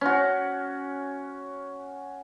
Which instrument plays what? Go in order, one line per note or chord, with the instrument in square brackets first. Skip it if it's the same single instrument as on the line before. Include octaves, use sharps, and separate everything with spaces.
[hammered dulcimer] C#4 F#4